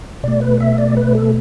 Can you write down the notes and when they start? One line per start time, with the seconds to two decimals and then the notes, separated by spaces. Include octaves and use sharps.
0.23 B2 A3 D5
0.41 B4
0.60 E5
0.78 D5
0.97 B4
1.15 A4